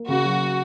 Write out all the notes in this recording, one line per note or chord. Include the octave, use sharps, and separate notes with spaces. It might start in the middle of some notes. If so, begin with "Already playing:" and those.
Already playing: A#3
C#3 F#4
F#3